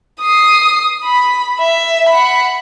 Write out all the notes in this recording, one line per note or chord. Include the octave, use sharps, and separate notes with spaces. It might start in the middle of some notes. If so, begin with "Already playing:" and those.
D#6 C7
B5
E5
F#5 B5